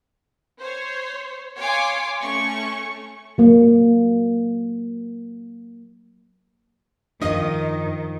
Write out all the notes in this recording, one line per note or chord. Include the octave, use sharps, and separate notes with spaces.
C5 C#5
C#5 F5 G#5 C6 D6
A3 C#4 C#6
F#3 A#3
F#2 D#3 F3 D4 D#5